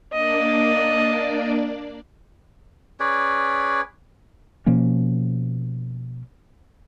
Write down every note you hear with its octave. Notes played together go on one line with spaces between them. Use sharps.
A#3 D4 D5 D#5
C#4 G#4 B4 D5
B2 F3 A#3 C#4